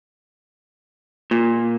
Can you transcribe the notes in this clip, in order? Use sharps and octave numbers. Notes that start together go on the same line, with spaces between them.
A#2